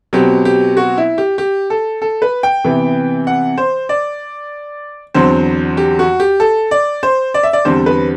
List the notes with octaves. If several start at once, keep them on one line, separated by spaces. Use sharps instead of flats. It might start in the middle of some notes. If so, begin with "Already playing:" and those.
B2 F#3 C4 G4
G4
F#4
E4
G4
G4
A4
A4
B4
G5
C3 E3 B3
F#5
C5
D5
E2 D3 F#3 C4 C5
G4
F#4
G4
A4
D5
C5
D5
E5
D5
E2 D3 G3 C4 C5
B4